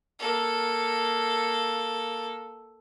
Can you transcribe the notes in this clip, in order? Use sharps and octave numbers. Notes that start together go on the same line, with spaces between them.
A#3 A4